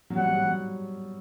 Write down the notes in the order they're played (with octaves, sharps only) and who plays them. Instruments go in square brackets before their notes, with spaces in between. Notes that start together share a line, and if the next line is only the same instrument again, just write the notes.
[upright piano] F#3
[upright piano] G3 [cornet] F#5
[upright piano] F#3
G3
F#3